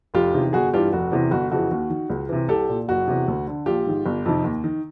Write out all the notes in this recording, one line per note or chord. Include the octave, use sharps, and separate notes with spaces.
F1 F4 G4
E2 C3 D#3
G1 F#4 G#4
G2 E3 F4 G4
F1 F#4
E2 C3 E3
G1 F#4
F2 C#3 E3 F#4
D#2
D#3
C#2
C3 E3
C2 G4 A4
A#2
F#1 F#4
E2 C3
D2
D3
A#1 F4 G4
G#2 D#3
G1
F2 C3 D#3
D#2
D#3